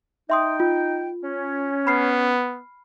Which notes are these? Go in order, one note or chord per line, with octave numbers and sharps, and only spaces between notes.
D#4 E5 G5 C6 D#6
F4
C#4
B3 B5 F6 C7